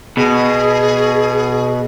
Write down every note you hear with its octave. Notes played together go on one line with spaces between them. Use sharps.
B2 G#4